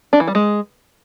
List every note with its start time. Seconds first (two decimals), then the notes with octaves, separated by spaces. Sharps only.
0.13 D4
0.20 E3
0.28 G3
0.35 G#3